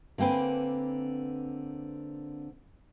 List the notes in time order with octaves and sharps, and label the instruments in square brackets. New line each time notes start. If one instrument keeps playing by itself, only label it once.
[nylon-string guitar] D3 A#3 C4 B4 G#5